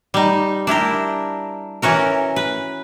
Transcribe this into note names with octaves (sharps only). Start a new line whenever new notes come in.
G3 D#4
D4 E4 G4 A#4
E3 C#4 F#4 A#4
B4